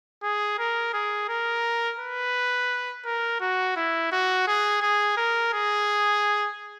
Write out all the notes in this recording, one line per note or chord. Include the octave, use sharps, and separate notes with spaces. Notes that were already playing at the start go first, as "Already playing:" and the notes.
G#4
A#4
G#4
A#4
B4
A#4
F#4
E4
F#4
G#4
G#4
A#4
G#4